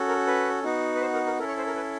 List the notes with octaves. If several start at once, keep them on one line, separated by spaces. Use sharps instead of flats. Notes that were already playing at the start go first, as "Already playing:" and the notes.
Already playing: C#4 F#4 A4
A#4
B4
B3 D#4 F#4
B4
C5
A#4
A#4
C#4 E4 A4 A#4
C#5
C5
A#4
B4